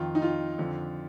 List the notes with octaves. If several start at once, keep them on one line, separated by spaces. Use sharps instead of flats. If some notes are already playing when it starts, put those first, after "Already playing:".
Already playing: F2 D#3 F4
D#4
F4
F2 D3 F3